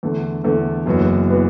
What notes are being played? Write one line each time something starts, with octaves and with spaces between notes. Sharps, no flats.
E2 D3 A3
E2 D3 A3
F#1 F#2 E3 B3 F#4
E3 B3 F#4